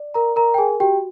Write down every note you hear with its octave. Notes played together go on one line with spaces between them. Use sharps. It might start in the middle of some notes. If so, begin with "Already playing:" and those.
Already playing: D5
A#4 A#5
A#4 A#5
G5
G#4 G#5
F#4 G4 G5